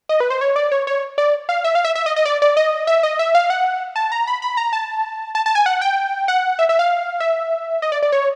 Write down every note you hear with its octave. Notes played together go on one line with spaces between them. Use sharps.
D#5
B4
C5
C#5
D5
C#5
C#5
D5
F5
E5
F5
E5
E5
D#5
D#5
D5
D5
D#5
E5
D#5
E5
F5
F#5
A5
A#5
B5
B5
A#5
A5
A5
A5
G#5
F#5
G5
F#5
E5
E5
F5
E5
D#5
D5
D5
C#5